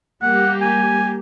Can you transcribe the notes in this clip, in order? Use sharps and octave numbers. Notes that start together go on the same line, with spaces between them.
G3 A#3 G4 F#5
G#5